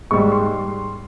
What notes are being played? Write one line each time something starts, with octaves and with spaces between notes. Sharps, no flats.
G#2 G3 C#6
C6